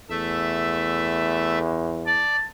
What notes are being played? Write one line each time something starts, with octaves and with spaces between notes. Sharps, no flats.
E2 A3 E5
D5 A5